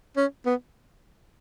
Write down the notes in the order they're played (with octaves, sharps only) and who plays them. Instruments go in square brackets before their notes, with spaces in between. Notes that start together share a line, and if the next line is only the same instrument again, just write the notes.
[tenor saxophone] C#4
B3